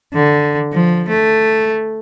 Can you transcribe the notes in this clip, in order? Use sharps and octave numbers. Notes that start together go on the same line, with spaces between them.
D3
F3
A3